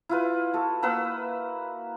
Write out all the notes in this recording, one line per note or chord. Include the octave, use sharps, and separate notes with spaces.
E4 F4 B4
F#4 A4
A#3 B4 F#5 E6